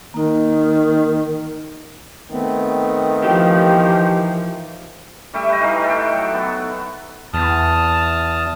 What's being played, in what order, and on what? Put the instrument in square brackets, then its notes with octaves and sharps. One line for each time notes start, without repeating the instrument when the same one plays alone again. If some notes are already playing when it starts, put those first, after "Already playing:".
[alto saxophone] D#3 [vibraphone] A#3 D#4
[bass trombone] D#3 [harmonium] A3 B3 C4
[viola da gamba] E3 F3 [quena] G4
[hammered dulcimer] G3 A3 G4 E5
B4 D#5
E3 G3 D#4 F5
A4 G5
F#3
B3
[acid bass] E2 [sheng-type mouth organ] A5 D#6 F6